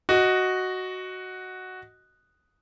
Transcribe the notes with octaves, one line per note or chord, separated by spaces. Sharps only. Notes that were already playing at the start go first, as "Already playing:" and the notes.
F#4 D#5